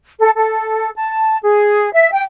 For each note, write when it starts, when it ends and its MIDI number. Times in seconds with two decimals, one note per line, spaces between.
0.19 0.31 69
0.36 0.90 69
0.95 1.37 81
1.42 1.92 68
1.93 2.10 76
2.12 2.21 79